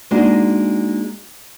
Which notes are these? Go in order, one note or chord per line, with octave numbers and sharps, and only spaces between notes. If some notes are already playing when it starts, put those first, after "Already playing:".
G#3 A#3 D4 D#4 F#4 D#5